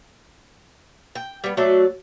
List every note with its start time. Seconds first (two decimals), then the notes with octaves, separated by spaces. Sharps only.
1.15 G5
1.44 G3 B3
1.57 F#3 A3 F#4 D5